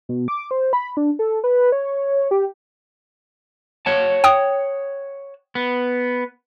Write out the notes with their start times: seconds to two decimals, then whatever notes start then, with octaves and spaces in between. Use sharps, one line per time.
0.09 B2
0.28 D6
0.51 C5
0.73 B5
0.97 D4
1.19 A4
1.44 B4
1.72 C#5
2.31 G4
3.86 C#5 F#5 A5
4.24 G5 D#6
5.55 B3